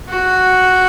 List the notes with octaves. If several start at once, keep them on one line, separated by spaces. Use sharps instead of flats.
F#4